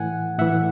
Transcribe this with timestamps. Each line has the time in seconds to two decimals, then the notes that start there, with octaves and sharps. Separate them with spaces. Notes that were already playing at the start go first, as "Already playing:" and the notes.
Already playing: A2 E3 F#5 G#5
0.39 A2 E3 E5 F#5